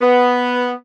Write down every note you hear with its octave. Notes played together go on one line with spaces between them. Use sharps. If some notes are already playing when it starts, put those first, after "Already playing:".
B3